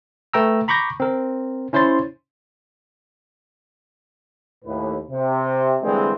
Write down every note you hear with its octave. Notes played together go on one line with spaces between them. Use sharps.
A3 B4 G5 A#5 E6
A#5 B5 C#6 D6 G6 A#6
C4 A#4
C#4 E4 C5 C#5 C6 A6
D#2 A2 B4
C3
D3 E3 G3 G#3 A#3 C4